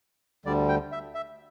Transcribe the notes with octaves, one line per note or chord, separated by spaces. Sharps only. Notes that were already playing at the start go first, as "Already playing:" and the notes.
D2 D3 G3 D5
G5
E5
E5